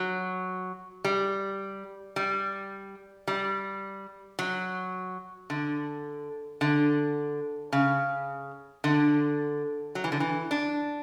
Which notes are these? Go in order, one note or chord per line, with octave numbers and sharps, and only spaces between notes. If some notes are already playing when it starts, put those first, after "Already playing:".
Already playing: F#3
G3
G3
G3
F#3
D3
D3
C#3
D3
F#3
E3
D3
E3
D4